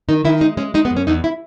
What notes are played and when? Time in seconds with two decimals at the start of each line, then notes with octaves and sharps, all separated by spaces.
0.09 D#3 D#4
0.25 D#3 E4
0.41 G#3 D#4
0.57 G#3 C#4
0.74 G#3 D#4
0.85 B3
0.90 F#2
0.97 C#4
1.07 E2 D#4
1.24 E4